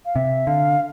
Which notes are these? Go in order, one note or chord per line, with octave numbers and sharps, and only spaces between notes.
F5
C3 E5
D3 F5